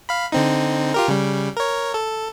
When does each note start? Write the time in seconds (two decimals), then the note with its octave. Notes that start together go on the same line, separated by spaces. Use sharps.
0.09 F5 B5
0.32 D3 C4 D#4
0.94 F4 G4 A#4
1.08 C#3 G3
1.57 A#4 C#5
1.94 A4